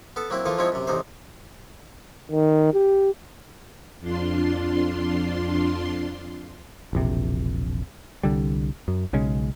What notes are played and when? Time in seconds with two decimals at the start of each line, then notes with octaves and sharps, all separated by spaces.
0.16 B3 A4 A5
0.30 F#3 A#3 C4 E4
0.46 E3 F3 A#3 F4 A4
0.58 F3 G#3 C4 D#4 E4 C#5
0.72 F#2 C3
0.87 A1 E2 C3 D#4 C5
2.32 D#3
2.74 G4
4.01 F2 D4 F4 C6
6.93 E1 A#1 C3
8.23 C2 D3 G3
8.88 F#2
9.13 B1 C#3 G#3 C#4